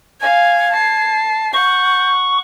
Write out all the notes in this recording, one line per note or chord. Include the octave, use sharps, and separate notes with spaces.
F5 G#5 G#6
A5 C7
F#5 C#6 G6